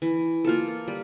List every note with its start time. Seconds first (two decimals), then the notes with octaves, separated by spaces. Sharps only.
0.02 E3
0.45 A#3 F4 A4
0.88 G3